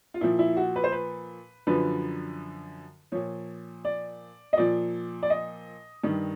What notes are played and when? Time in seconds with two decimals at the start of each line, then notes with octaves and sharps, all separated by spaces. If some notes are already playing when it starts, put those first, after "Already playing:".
0.14 F4
0.21 A#2 F3 E4
0.39 E4
0.57 F#4
0.76 B4
0.84 C5
0.92 B4
1.67 F#2 D3 F3 B4
3.12 A#2 F3 C#5
3.85 D5
4.53 D#5
4.57 A#2 F3 D5
5.23 D5
5.30 D#5
6.04 G2 D#3